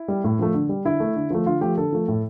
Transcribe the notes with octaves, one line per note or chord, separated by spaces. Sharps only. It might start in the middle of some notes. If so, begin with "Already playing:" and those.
Already playing: E4
G3
A2
F3 A3
D3
G3
D3 E4
A3
D3
F3 A3
D3 F4
F3 A3 G4
D3 A4
F3 A3
A2